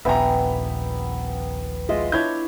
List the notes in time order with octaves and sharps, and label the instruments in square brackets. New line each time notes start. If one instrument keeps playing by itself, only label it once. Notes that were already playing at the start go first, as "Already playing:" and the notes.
[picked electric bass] D#1 A#1 [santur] B3 G5 D6 [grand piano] E5 G#5 A#5
[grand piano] G#3 [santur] F4 D#5 E5
[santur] D4 E4 C#5 [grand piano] G6 G#6